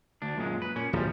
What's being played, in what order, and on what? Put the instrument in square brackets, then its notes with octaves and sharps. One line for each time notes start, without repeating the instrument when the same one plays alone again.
[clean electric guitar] D2 D4
F#2 A#2 G#3
B4
[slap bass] A#2 [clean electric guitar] C#4
[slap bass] D1 A#1 [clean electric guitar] F3 G3